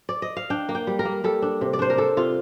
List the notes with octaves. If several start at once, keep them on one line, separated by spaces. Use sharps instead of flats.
D5
D#5
F5
D4 G5
A#3
G5
G3
A#4
A#3
G3 A4
D4
C3
D5
D4 C5
A#4
D4 A4
C3 F4